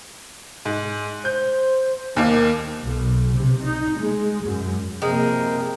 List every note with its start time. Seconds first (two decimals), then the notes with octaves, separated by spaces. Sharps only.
0.65 G#2
1.25 C5 G6
2.16 D#2 D#3 A#3
2.83 B1
3.33 C3
3.64 D#4
3.96 G#3
4.44 F#2
5.02 C3 F3 G#3 A#3 A#4 G5